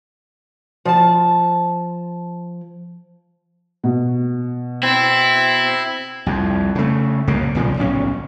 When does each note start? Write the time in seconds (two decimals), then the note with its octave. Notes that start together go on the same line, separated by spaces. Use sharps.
0.85 F3 A5
3.84 B2
4.83 C4 E4
6.26 C2 F2
6.75 C#3 A3
7.28 C2 F#2 C#3 A#3
7.55 B1 A#2 C#3 F3
7.77 D1 B1 C#4